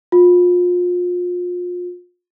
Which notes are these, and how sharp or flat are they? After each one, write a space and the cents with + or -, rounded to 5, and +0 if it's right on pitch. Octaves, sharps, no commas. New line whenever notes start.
F4 +30